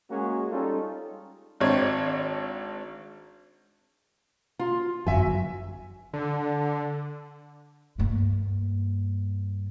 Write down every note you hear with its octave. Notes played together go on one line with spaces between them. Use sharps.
G#3 A#3 C#4 F#4 G#4
G3 C#4 D#4 F4 A4
G#1 C4 D4 C#5
F4
G1 F#2 F#3 E5 G#5
D3
G2 A#3